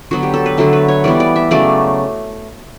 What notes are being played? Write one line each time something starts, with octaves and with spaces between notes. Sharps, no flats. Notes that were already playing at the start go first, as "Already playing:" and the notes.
D3 F#3 B3 F#4
G4
A4
B4
D3 F#3 A3 A4
B4
C#5
E3 G3 B3 D5
D5
E5
C#3 F#3 A3 D5